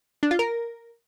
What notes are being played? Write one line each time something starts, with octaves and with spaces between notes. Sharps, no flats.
D4
F4
A#4